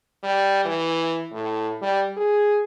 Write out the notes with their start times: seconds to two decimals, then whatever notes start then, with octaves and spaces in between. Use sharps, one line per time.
0.23 G3
0.65 E3
1.31 A2
1.82 G3
2.17 G#4